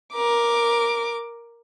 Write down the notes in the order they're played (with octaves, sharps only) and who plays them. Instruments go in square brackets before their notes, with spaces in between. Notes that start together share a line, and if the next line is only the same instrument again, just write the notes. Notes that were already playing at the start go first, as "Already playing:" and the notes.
[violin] A#4 D6